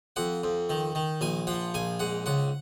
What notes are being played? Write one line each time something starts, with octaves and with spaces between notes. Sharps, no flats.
F2 F#5
F2
D#3
D#3
A#1 G#5
F3 F#5
A#1 G#5
G#2 F#5
C#2 F#5